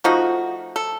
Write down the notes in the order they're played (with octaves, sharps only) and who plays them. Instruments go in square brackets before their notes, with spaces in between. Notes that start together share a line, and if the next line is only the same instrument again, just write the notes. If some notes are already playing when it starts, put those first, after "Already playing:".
[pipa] F3 A3 D#4 F#4
A4